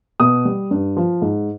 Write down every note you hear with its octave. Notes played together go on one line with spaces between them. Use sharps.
B2 D#6
G3
G2
F3
G#2